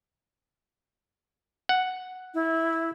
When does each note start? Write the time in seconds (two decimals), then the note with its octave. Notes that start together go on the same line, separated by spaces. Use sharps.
1.69 F#5
2.34 E4